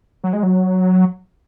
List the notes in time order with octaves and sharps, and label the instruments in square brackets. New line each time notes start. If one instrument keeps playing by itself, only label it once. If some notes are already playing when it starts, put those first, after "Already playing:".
[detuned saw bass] F#3
G#3
F#3